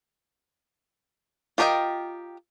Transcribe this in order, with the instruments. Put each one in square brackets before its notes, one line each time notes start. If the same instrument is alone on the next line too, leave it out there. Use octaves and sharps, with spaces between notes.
[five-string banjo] F4 G4 A#4 D#5 G5